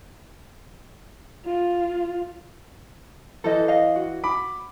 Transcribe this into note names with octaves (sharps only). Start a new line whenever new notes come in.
F4
E3 A4 C5 D#5
D#5 F5
F#4
B5 D6